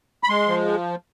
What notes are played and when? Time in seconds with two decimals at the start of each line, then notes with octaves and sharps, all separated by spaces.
0.23 B5
0.29 G#3 C6
0.48 F3